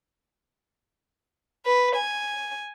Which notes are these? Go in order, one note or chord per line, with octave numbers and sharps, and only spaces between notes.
B4
G#5